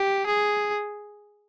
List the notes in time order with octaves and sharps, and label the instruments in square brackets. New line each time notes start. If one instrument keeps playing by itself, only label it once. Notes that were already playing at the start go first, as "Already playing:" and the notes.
Already playing: [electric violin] G4
G#4